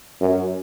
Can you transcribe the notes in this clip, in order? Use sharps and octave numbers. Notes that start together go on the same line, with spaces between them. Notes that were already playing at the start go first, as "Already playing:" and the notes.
F#2